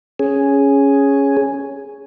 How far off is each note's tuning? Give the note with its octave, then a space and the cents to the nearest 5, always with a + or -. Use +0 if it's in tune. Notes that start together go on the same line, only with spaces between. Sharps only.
C#4 +0 G#4 +0